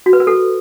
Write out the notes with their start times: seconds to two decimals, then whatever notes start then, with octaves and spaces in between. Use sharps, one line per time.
0.06 F#4
0.13 B4
0.20 A#4
0.27 A4